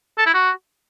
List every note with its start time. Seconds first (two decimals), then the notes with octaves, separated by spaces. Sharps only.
0.18 A4
0.26 E4
0.34 F#4